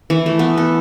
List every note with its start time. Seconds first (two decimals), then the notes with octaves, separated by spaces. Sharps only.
0.10 E3
0.26 A3
0.39 B3
0.58 A4